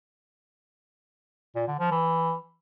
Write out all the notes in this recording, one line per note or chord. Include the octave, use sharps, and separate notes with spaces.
A#2
D3
F3
E3